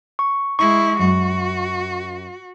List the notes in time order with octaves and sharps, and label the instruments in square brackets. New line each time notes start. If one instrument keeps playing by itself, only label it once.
[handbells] C#6
[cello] G#3 E4 [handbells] C#6
[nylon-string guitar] F#2 [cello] F#4